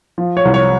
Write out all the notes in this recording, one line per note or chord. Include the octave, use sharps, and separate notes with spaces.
F3
C#5
C2
C#5